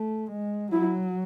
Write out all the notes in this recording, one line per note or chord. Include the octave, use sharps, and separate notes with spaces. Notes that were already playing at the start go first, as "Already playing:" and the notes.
Already playing: A3
G#3
F#3 E4